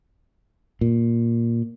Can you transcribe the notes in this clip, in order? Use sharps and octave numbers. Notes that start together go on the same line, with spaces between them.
A#2